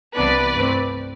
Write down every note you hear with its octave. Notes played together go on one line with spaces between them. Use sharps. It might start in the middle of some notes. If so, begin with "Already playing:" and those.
C2 C3 E3 B3 D4 B4 D5
G2 E3 A3 C4